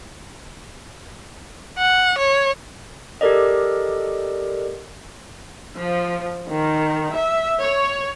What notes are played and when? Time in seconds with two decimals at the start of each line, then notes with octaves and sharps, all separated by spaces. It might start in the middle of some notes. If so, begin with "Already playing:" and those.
1.78 F#5
2.18 C#5
3.21 G4 A4 A#4 D5 D#5
5.78 F3
6.51 D#3
7.13 E5
7.61 C#5